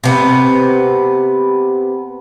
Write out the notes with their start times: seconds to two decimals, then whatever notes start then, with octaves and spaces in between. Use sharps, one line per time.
0.04 C3 B3